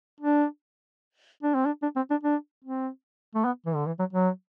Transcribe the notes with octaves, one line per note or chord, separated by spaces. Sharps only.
D4
D4
C4
D4
D4
C4
D4
D4
C4
A3
B3
E3
D3
E3
F#3
F#3